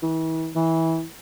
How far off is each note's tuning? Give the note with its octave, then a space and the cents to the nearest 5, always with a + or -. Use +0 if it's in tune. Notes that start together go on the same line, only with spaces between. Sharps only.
E3 -35
E3 -20